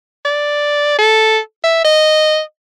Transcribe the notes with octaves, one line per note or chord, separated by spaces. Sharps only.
D5
A4
E5
D#5